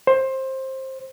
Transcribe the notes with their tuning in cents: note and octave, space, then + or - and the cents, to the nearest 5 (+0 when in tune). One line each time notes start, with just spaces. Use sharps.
C5 +20